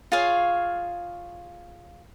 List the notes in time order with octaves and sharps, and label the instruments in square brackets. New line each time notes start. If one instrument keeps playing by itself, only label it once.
[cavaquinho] F4 G#4 C#5 F5